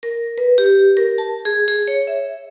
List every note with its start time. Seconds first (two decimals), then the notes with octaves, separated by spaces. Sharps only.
0.03 A#4
0.38 B4
0.58 G4
0.97 A#4
1.18 A5
1.45 G#4
1.68 G#4
1.88 C#5
2.07 E5